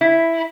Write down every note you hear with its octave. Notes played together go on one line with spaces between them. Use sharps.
E4